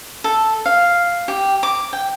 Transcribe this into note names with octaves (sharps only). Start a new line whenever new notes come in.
A4
F5
G4
D6
G5